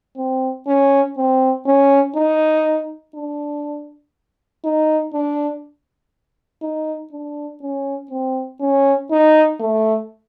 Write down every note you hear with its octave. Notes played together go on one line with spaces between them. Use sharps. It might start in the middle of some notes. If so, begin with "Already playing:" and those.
C4
C#4
C4
C#4
D#4
D4
D#4
D4
D#4
D4
C#4
C4
C#4
D#4
A3